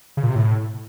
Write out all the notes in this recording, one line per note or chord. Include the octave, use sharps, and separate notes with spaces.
C#3
A#2
C3
A2